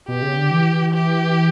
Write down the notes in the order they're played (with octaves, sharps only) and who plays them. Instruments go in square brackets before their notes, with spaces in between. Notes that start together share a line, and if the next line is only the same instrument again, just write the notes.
[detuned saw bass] B2 [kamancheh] G4
[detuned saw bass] C#3
D3
E3
[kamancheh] G4